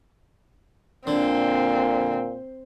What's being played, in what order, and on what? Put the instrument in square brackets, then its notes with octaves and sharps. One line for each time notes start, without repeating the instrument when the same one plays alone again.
[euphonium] A#2 [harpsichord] D3 [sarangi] C4